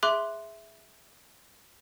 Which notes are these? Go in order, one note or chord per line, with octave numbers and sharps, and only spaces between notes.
G#4 E5 C6 D6 F#6